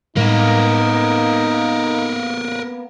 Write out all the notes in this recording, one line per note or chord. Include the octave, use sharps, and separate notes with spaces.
A2 G3 G#3 A#3 B3 D#4 A#4 B4